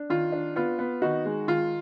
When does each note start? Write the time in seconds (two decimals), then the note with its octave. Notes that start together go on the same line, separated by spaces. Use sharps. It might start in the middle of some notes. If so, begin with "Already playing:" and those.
Already playing: D4
0.10 D#3 F4
0.32 D4
0.56 B3 F4
0.79 B3
1.02 D#3 D#4 F#4
1.25 G#3
1.48 D#3 F4